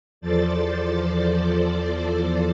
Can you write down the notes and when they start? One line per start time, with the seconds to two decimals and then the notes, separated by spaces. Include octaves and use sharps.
0.21 E2 F3 A4 C5 D5 A6